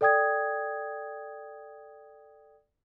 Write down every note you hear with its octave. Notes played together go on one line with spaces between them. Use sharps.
A4 D5 G5 D#6 G#6